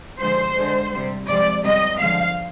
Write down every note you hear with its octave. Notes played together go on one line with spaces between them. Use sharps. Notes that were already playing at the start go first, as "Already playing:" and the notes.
D3 F3 G#3 C5
D3 G#3
C3 G3
C3 F3 G#3 D5
C3 G3 D#5
D3 F3 G#3 F5